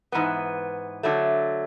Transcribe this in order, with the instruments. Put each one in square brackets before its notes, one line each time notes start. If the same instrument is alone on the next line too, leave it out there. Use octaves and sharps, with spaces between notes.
[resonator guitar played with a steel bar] G#2 E3 B3
D3 F#3 A3